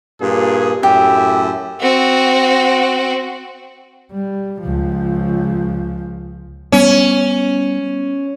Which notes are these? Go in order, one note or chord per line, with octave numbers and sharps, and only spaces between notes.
G2 A#2 G#4
F#2 A2 G4 E5
C4 F#4
G3
C#2 F3
G3 B3 C#4